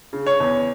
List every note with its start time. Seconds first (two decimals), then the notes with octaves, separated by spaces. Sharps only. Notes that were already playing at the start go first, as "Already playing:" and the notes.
0.13 C#3
0.26 C#5
0.40 E2